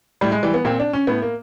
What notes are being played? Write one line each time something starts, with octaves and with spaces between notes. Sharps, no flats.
A2 G3
G#3
E3 G3
B3
A#2 C4
D4
C#4
A2 B3
A#3